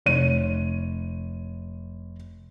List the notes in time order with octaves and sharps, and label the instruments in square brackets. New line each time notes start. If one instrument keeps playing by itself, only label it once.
[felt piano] F1 C#5 D#7